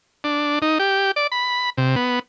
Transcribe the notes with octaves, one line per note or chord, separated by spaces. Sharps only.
D4
D#4
G4
D5
B5
C3
B3